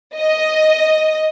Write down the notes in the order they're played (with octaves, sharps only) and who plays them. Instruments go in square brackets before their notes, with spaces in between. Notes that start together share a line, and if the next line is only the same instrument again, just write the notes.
[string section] D#5